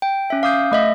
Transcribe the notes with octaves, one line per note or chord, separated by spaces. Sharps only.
G5
C#4 E5
F5 D6 D#6 G6 C7
A3 D#5 E5